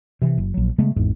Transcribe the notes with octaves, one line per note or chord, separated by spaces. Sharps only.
C3 E3
F#1
A#1 F#3
C#3 G#3 A3 B3
G#1 E2 G#2